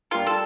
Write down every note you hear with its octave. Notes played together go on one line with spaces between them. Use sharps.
G3 D4 F4 G4 A#4
A4